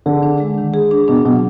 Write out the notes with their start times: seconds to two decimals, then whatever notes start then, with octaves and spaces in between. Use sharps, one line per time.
0.06 D3 G#4
0.23 D4
0.40 G#3
0.58 D#3
0.74 G#4
0.91 D4
1.08 B2 D4
1.25 B2 F#3